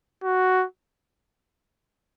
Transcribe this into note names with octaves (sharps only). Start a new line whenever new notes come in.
F#4